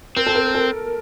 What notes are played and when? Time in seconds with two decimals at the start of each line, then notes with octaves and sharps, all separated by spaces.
0.16 C4 A#4
0.27 A4
0.35 A#4
0.55 A4